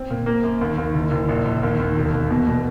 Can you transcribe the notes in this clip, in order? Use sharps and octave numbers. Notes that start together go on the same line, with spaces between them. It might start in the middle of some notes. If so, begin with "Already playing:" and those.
Already playing: C4
A#2
A#3
F#2
D#2
D#2
F#1
F#1
A#1
A#1
D#2
D#2
E1
E1
B2
B2